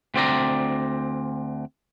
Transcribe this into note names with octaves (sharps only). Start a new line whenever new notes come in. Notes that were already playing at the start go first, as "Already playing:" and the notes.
D2 C4 D5 A#5